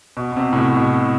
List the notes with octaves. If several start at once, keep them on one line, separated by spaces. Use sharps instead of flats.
B2
B2
C3
A2
B2
B2